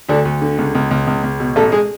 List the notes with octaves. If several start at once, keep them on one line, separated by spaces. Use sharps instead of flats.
D2 D3 D4
D2
D3
C#2
C#2
C#2
C#2
C#2
B2
A1 A3 A4
G#3 G#4